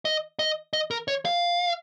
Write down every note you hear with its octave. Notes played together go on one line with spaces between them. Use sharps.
D#5
D#5
D#5
A#4
C#5
F5